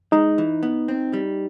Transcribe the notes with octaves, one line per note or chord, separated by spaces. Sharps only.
G#3 D#4
E3
B3
C4
G3